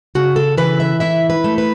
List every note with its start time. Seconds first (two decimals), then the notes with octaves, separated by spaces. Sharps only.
0.15 C#3 F#4
0.36 A4
0.57 E3 B4
0.80 E5
1.00 E4 E5
1.30 B4
1.44 A3
1.58 B4